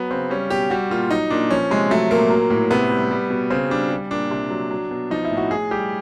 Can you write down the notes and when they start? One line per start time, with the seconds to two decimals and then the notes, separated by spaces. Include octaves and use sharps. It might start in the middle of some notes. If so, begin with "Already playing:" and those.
Already playing: F#3 B3
0.11 C#3 C4
0.30 G3 C#4
0.50 B2 G4
0.70 G3 F#4
0.90 A#2 F4
1.11 F#3 D#4
1.30 A#2 D4
1.51 F3 C#4
1.71 C3 G#3
1.91 F#3 A3
2.11 A#2 A#3
2.30 F#3
2.50 A2
2.71 C3 B3
2.91 G3
3.11 G3
3.30 B2
3.50 C#3 C4
3.70 G3 D4
3.90 G3
4.11 A#2 D4
4.31 C3
4.50 F#3
4.71 F#3
4.91 B2
5.11 F3 D#4
5.25 E4
5.31 A2
5.37 F#4
5.51 A2 G#4
5.71 G3 G4